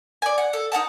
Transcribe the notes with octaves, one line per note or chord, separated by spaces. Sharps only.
D5 G#5
F#5
A4
D#4 D5 F#5 A5